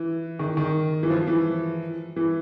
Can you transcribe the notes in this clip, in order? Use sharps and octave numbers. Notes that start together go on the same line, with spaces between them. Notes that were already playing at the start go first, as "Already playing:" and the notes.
Already playing: E3
D#3
D#3
E3
F3
E3
E3